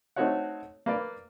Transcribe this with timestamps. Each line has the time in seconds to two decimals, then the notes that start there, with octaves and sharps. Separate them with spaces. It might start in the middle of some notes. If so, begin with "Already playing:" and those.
0.16 A3 C4 D#4 F#4 C#5 F#5
0.86 A#3 B4 D5